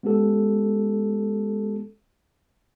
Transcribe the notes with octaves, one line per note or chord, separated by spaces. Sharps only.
G#3 B3 C#4 G4 A4